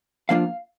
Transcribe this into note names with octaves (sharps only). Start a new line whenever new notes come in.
F3 A#3 D4 F4 F5